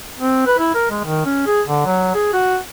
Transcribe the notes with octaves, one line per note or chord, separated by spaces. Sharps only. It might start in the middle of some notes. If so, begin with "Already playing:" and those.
C4
B4
E4
A#4
G#3
D#3
C#4
G#4
D3
F#3
G#4
F#4